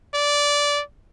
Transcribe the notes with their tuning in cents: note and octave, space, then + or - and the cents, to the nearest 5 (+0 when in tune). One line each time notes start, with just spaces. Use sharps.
D5 -15